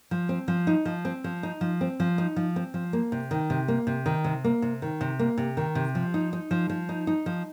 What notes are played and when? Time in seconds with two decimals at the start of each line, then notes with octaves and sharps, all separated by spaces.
0.11 F3
0.29 C4
0.48 F3
0.67 D#4
0.85 F3
1.05 C4
1.24 F3
1.43 D#4
1.61 F3
1.81 C4
2.00 F3
2.18 D#4
2.36 F3
2.56 C4
2.74 F3
2.93 A#3
3.12 C3
3.31 D#3
3.50 C3
3.68 A#3
3.87 C3
4.06 D#3
4.24 C3
4.44 A#3
4.62 C3
4.82 D#3
5.01 C3
5.19 A#3
5.38 C3
5.57 D#3
5.75 C3
5.95 F3
6.14 D#4
6.33 D#4
6.51 F3
6.69 F3
6.89 D#4
7.07 D#4
7.26 F3